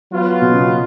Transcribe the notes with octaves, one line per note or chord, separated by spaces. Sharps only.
F#3 B3 F4 B4
B2
C#3
B2